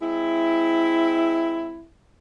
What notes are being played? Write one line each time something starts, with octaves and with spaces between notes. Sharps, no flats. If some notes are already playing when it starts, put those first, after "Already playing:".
G#3 C4 E4